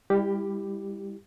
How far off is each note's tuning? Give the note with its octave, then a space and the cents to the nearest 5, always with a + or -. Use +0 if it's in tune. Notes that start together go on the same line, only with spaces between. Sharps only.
G3 +30 E4 +0 G4 +0